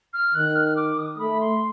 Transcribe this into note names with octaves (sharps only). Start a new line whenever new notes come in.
F6
D#3 F#6
F6
D6
D#6
A3 B5
C6